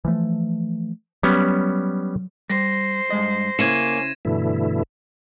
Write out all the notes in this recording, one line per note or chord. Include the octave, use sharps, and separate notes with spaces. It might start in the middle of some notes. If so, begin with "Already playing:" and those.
E3 F3 A3
F#3 G3 B3 C#4
G3 C5 A#6
G2 G#3 D#5
C#3 A#3 C#4 E4 G#6 D#7 E7
G2 B2 D3 E3 A3 E4